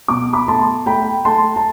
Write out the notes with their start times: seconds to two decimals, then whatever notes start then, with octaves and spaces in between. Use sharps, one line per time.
0.08 B2 D6
0.33 B5 D6
0.48 A3 A5 C6
0.86 A3 G5 B5
1.25 A3 A5 C6
1.56 A5